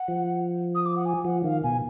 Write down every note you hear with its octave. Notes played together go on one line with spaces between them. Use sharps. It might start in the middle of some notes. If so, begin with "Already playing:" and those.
Already playing: F#5
F3
D#6
D6
F#5
G#5
F3 F#5
D#3 F5
B2 G#5